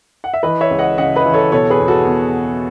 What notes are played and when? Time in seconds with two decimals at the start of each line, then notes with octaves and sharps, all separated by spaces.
0.24 F#5
0.34 E5
0.43 E3 B4 D#5
0.61 C#5 E5
0.71 C#2
0.79 D#5 F#5
0.98 C#3 D#5 F#5
1.16 B4 D#5
1.25 E3
1.34 A4 C#5
1.52 B2 A4 C#5
1.70 G#4 B4
1.80 E2
1.88 F#4 A4
2.07 B2